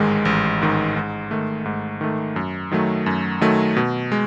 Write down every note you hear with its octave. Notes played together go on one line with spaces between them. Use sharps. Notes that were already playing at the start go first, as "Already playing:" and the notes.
Already playing: A1 G#2 D#3 G#3
A1
G#2 D#3 G#3
G#2
D#3 A3
G#2
D#3 A3
F#2
D#3 F#3 A3
F#2
D#3 F#3 A3
B2
G#3